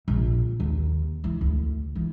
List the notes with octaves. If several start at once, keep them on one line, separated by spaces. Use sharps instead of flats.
A#1
D#2
E3
D2
E3